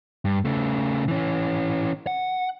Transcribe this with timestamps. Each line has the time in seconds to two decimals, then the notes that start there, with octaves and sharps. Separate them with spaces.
0.25 G2
0.45 C#3 A3
1.08 E3 C#4
2.07 F#5